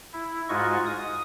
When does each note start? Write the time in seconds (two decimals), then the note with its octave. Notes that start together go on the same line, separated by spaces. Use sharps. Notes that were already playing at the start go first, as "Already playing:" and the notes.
0.13 E4
0.49 G#2 G#3 F4 F#4 D#5 C#6
0.86 D#6